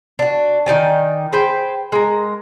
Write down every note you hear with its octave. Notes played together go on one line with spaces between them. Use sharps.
D4 F#4
D#3 D#4 D5 G#5
G#4 B4 C5 G5
G#3 A#4